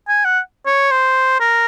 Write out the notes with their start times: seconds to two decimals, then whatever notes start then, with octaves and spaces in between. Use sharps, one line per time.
0.08 G#5
0.25 F#5
0.66 C#5
0.91 C5
1.40 A#4